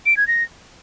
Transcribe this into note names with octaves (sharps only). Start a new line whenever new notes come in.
D7
G#6
A#6